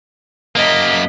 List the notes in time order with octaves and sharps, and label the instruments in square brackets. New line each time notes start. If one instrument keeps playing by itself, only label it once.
[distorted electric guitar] F#2 A#3 [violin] D#5 B6